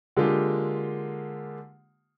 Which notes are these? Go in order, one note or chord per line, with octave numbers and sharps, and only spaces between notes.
D3 G#3 A#3 F4 G4